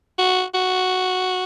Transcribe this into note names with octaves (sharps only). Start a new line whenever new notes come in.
F#4
F#4